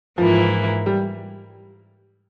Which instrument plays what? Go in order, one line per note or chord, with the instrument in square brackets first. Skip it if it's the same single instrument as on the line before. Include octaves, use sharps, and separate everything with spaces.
[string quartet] G#2 E3 A#3 E4 [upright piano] F3
[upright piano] G3